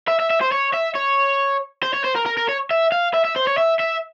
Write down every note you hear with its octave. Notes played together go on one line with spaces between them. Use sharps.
E5
E5
E5
C5
C#5
E5
C#5
C5
C#5
C5
A#4
A#4
A#4
C#5
E5
F5
E5
E5
C5
C#5
E5
E5